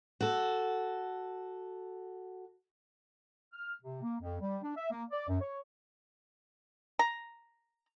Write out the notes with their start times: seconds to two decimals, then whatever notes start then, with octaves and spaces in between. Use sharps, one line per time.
0.20 F#4 A4
3.52 F6
3.83 C3
4.02 A#3
4.21 F2
4.41 G3
4.63 D4
4.76 E5
4.91 A#3
5.11 D5
5.28 F#2
5.41 C#5
6.99 A#5